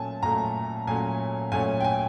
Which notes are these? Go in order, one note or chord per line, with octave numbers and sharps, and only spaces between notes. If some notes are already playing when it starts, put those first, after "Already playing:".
Already playing: A#2 F#3 A3 C#4 G#5 A5
A#2 F#3 A3 C#4 A#5
A#2 F#3 A3 C#4 G#5
A#2 F#3 A3 C#4 G#5
G5
G#5